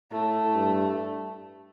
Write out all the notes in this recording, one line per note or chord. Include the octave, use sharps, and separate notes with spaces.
A2 A3
G2